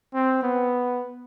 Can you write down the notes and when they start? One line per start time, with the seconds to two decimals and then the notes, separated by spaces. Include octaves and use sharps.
0.14 C4
0.43 B3